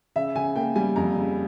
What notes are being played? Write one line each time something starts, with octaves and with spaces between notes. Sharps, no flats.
C#3 E5
C#3 G#5
A#3 G5
G3 G#5
F2 A#5
C#3